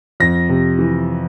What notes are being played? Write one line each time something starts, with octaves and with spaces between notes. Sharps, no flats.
F2 A#6
C3
E3